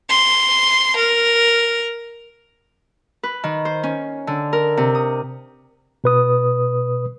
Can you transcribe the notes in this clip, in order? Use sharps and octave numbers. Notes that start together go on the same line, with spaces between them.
C6
A#4
B4
D#3
C5
C#4
D3
A#4
C3
D#6
B2 B4 D#6